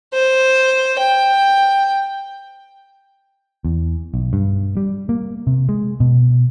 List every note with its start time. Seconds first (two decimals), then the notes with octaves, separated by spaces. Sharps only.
0.13 C5
0.99 G5
3.65 E2
4.14 B1
4.33 G2
4.77 G3
5.09 A#3
5.47 C3
5.69 G#3
6.00 B2